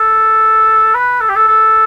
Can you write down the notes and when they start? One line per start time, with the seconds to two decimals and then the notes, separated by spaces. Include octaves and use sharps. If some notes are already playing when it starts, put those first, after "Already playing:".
Already playing: A4
0.95 B4
1.21 A4
1.29 G4
1.36 A4
1.48 A4